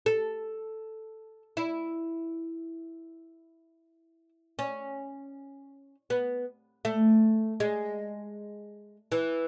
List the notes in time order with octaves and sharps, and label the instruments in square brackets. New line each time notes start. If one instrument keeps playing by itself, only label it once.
[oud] A4
E4
C#4
B3
A3
G#3
E3